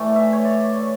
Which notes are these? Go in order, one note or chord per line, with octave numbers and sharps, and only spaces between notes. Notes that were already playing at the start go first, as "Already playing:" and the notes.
Already playing: A2 E3 A3 D5
E5
C#5
D5
C#5